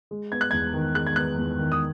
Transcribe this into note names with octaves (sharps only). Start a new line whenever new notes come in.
G#3
B3 G#6
F#6
E2 G#6
D#3
G#3 F#6
G#6
B3 F#6
E2
D#3
D#6